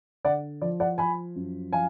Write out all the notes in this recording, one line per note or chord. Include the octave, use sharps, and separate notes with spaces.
D3 D5 F#5
F3 D5
D5 F#5
F3 G#5 B5
F#2
F3 F5 G#5